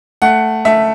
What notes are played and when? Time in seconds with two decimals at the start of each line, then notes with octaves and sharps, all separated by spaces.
0.22 A3 F#5
0.65 A3 E5